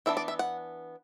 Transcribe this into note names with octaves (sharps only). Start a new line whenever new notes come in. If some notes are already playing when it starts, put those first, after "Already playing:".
E3 B3 D4 E5
D5
E5
F#5